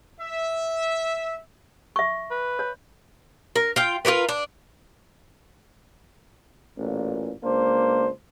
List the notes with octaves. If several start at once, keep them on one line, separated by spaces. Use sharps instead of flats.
E5
E5 C#6
B4
C#5
A#4
F4 G5
F4 G4 A#4 B4
D4
A1 A#2
C#2 A#3 D4 C5